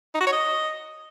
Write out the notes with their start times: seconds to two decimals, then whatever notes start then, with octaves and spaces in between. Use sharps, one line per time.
0.15 D#4
0.21 F#4
0.27 C#5
0.32 D#5